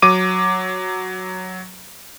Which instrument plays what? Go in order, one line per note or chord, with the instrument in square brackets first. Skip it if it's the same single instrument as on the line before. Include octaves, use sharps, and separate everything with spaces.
[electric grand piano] F#3 D6 D#7